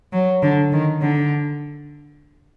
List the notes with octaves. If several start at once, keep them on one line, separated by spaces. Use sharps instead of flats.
F#3
D3
D#3
D3